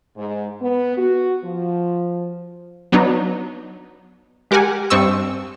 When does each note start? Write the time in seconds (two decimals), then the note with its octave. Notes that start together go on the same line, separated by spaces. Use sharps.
0.17 G#2
0.61 B3
0.97 F#4
1.45 F3
2.92 F#3 B3 D4 D#4
4.51 G#3 G4 A#4 F#5 G#5
4.90 G2 C4 D#5 C#6 E6